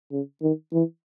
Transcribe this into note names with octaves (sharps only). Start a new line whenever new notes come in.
C#3
D#3
E3